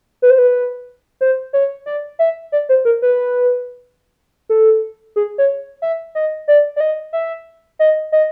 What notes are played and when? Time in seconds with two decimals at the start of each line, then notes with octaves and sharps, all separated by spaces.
0.22 B4
0.30 C5
0.38 B4
1.21 C5
1.53 C#5
1.86 D5
2.19 E5
2.52 D5
2.69 C5
2.85 A#4
3.02 B4
4.49 A4
5.16 G#4
5.38 C#5
5.82 E5
6.15 D#5
6.48 D5
6.76 D5
6.80 D#5
7.13 E5
7.79 D#5
8.12 D#5